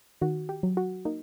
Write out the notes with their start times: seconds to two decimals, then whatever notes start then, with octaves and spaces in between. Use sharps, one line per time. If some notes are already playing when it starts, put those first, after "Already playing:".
0.21 D#3 F#4
0.49 G4
0.63 F#3
0.77 F#4
1.05 A#3 D#4